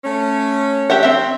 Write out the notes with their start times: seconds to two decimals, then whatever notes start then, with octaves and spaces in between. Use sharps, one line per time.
0.04 A3 C#4
0.90 G4 E5 F#5
1.03 C4 E5